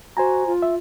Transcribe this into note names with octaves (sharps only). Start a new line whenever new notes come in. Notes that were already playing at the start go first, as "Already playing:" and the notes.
F#4 C5 G#5 A#5
F4
E5